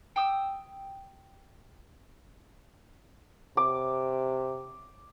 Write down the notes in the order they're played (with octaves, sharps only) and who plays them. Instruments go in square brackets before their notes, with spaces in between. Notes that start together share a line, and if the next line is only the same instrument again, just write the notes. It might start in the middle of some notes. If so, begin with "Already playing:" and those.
[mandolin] G5 D#6 E6
[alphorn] C3 [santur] D6